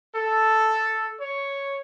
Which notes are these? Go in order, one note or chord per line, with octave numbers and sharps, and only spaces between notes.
A4
C#5